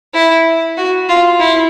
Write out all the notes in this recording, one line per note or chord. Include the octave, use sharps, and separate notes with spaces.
E4
F#4
F4
E4